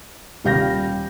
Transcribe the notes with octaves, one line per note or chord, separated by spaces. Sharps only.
D#1 G3 F5 G6 A#6